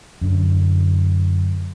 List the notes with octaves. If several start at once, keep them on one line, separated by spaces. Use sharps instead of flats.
F#2 D3